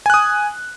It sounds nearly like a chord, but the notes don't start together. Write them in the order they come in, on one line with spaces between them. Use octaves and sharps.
G#5 F#6 D#6